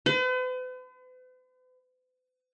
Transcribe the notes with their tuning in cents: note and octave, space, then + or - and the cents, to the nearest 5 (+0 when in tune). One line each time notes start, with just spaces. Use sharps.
B4 +45